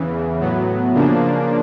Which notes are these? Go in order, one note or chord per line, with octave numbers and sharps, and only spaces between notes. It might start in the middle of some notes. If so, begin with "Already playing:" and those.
Already playing: E2 C#3 E3
A2 F#3 B3
C#3 F3 A#3 D4